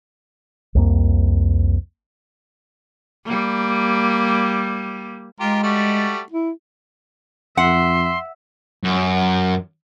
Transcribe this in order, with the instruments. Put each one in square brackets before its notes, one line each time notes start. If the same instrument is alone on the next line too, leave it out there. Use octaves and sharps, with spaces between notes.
[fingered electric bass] C2 F2 A#3
[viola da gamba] G3 A#3
[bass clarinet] G#3 [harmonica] F4 G4 A#4
[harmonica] G3 A3 F#4
[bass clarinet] E4
[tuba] F2 [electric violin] E5 [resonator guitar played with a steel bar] F#5 [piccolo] C6
[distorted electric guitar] F#2